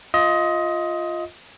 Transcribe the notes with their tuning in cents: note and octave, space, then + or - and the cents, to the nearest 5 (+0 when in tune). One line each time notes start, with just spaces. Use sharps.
F4 +0 D#5 +20